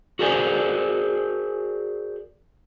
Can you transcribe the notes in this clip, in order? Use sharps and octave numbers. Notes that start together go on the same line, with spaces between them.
F#4 G#4 A#4 C5 D5 G#5